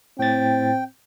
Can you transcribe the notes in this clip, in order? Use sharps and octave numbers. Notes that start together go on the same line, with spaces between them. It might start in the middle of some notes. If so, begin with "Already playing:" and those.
A2 C4 G5 A6